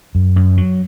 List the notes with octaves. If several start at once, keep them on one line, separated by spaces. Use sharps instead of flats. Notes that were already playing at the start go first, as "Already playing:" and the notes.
F#2
F#2
F#3